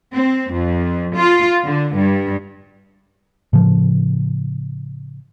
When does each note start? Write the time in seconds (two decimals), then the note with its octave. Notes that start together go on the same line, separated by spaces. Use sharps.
0.14 C4
0.53 F2
1.16 F4
1.66 D3
1.95 G2
3.53 A2 C#3 F3